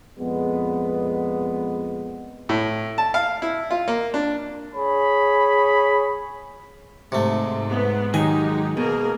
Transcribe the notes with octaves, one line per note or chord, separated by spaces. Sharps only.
F2 A#2 G#3 B3
A2
A5
F5
E4
F4
A#3
D4
G#4 C#5 B5
G#2 C3 A3
B3
D#3 F#3 G#3 D#4 G4 G#5
B2 A#3 G#4 A#4